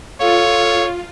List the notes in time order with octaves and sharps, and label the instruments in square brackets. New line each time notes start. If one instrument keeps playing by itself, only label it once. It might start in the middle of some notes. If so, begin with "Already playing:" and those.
[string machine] F4 [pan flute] A4 [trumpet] C#5 [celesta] F5